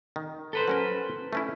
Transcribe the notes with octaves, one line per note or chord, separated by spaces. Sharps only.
D#3
A4 B4 C5
F#3 C#4 A#4
A3 C#4 E4